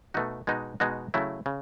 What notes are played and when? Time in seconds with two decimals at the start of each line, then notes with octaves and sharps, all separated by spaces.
0.14 B2 A3 D#4 F#4
0.47 B2 G#3 D#4 F#4
0.80 B2 G#3 D#4 F#4
1.14 C#3 F#3 A3 E4
1.46 C#3